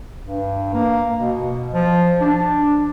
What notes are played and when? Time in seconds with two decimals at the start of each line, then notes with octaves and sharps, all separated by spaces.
0.23 G2
0.74 A#3
1.16 B2
1.74 F3
2.21 D4